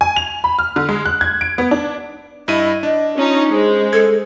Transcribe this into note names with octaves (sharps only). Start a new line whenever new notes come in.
G#5
F7
B5
F6
D3
G#3
F#6
G#6
D7
B3
D4
G2 E4 D#5 D#7
D4 D#5
C#4 D#4 F4
G#3 C5
A4 G#6